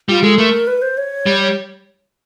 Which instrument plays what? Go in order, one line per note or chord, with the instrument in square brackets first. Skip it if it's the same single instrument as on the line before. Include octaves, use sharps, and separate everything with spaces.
[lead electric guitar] G3 [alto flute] F4
[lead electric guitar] G#3 [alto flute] A4
[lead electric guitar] A3 [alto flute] A#4
[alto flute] B4
C5
C#5
[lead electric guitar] G3